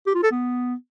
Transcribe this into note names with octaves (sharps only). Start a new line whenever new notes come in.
G4
F4
A4
B3